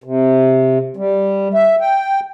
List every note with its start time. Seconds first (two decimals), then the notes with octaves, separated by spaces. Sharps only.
0.04 C3
0.97 G3
1.54 E5
1.80 G5